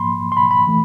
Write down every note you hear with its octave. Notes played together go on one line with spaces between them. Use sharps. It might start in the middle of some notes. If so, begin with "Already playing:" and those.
Already playing: G#2 F3 A#3 B5 C6
C6
B5
B5
E3 A3